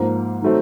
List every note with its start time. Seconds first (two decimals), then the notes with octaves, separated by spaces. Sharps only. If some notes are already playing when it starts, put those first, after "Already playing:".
Already playing: G#2 F3 A#3
0.42 D#3 F#3 A3 C4